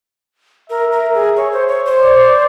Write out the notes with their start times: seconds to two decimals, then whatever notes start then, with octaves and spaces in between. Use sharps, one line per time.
0.70 A#4 E5
0.92 A#4
1.14 G#4
1.37 C#5
1.52 C5
1.69 C#5
1.86 C5
2.02 D5